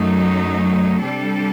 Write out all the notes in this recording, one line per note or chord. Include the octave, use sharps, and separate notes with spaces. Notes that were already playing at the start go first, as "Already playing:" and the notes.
Already playing: F#2 F#3 A3 D#4
C3 G3 D4 A4